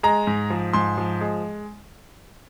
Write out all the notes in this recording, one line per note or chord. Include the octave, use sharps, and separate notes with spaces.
G#3 A#5
G#2
F3
G#2 C6
F3
G#3